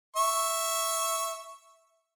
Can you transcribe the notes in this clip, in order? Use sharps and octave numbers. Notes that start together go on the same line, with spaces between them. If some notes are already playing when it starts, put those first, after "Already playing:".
E5 C#6